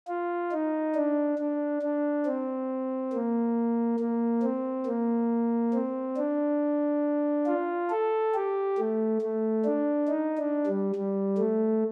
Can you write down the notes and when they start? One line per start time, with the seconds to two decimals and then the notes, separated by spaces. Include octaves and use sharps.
0.08 F4
0.52 D#4
0.95 D4
1.38 D4
1.82 D4
2.26 C4
3.13 A#3
4.00 A#3
4.43 C4
4.86 A#3
5.74 C4
6.17 D4
7.47 F4
7.90 A4
8.34 G4
8.78 A3
9.22 A3
9.65 D4
10.08 D#4
10.38 D4
10.66 G3
10.95 G3
11.38 A3